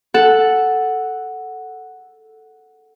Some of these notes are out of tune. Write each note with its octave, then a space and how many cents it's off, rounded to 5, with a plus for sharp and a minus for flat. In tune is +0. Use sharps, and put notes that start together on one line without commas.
A4 +0 F#5 +0 E6 +0